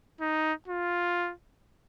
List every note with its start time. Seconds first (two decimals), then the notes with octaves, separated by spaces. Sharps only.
0.21 D#4
0.68 F4